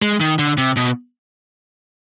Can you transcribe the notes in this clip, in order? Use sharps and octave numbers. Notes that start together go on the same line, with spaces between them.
G#3
D#3
D3
C3
B2